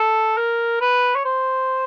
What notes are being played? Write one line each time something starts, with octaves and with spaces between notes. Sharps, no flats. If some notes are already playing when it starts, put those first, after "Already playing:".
Already playing: A4
A#4
B4
C#5
C5